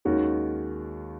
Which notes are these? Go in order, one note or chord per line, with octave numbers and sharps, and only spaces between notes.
D#2 D#3 G#3 C#4 F#4